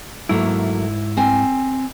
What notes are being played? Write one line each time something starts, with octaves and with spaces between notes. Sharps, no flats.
G#2 F#3 A3 A#3 E4
C4 G#5